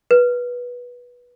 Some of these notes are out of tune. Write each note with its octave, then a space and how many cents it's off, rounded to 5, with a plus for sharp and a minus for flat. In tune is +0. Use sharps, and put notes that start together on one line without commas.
B4 -15